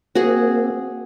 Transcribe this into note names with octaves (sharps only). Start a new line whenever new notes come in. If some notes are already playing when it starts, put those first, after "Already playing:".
A#3 C4 F#4 G#4